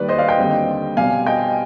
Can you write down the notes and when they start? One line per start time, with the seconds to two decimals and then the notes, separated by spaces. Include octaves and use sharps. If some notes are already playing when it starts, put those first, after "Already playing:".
Already playing: D#2 D#3 G3 B4 D5
0.09 C5 D#5
0.18 D5 F5
0.28 D#5 G5
0.38 D#2 D3 G3 C4
0.97 B2 G3 C4 F5 G#5
1.26 D#5 G5